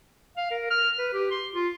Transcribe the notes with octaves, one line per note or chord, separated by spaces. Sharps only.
F5
A#4
F6
B4
G4
C6
F4